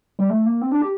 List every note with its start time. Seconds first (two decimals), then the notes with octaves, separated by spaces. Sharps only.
0.19 G3
0.30 A3
0.46 A#3
0.61 C4
0.71 D4
0.82 G4